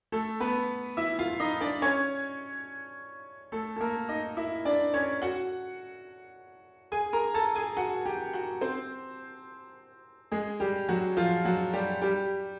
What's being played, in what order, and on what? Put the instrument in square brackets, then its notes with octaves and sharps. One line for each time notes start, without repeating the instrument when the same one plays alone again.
[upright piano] A3 A4
B3 B4
E4 E5
F4 F5
D#4 D#5
D4 D5
C#4 C#5
A3 A4
A4
A#3 A#4
D#4 D#5
E4 E5
D4 D5
C#4 C#5
F#4 F#5
G#4 G#5
A#4 A#5
A4 A5
G#4 G#5
F#4 F#5
G4 G5
F#4 F#5
C4 C5
G#3 G#4
G3 G4
F#3 F#4
F3 F4
F#3 F#4
G3 G4
G3 G4